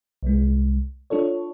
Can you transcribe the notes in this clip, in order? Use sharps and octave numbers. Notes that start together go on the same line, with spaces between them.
C2 G#3
D4 F4 A4 C#5